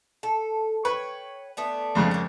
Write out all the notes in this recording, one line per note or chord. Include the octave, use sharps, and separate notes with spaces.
A4
B4 C#5 G5
A3 B3 D4
F2 G#2 C#3
A#3 C#4